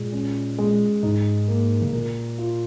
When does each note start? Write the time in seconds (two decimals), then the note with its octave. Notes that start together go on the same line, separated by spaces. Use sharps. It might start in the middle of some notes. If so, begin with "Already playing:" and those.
Already playing: A#2 G#3
0.13 C#4
0.58 G#3
1.03 G#2 D#4
1.48 A#3
1.82 C#3
1.93 A#2 A#4
2.38 F4